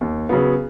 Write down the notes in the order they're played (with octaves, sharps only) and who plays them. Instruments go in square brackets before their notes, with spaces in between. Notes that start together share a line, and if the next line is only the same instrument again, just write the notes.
[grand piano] D#2
C#3 F#3 B3